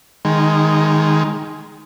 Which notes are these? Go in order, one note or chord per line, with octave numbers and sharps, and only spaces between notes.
D#3 G#3